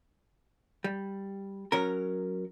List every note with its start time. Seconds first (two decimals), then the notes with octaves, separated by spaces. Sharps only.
0.84 G3
1.72 F#3 C#4 A#4